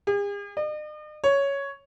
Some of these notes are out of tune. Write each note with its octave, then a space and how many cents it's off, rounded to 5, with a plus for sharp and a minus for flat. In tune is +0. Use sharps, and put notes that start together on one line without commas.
G#4 -45
D#5 -45
C#5 +5